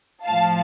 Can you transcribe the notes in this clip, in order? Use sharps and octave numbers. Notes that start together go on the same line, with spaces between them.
A2 F3 F5 A5